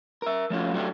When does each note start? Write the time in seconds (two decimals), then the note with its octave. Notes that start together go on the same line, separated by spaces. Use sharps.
0.22 A#4 E5
0.50 F3 A3 C#4 F4 F#4
0.74 F#3 A3 B3 D4 F#4 G4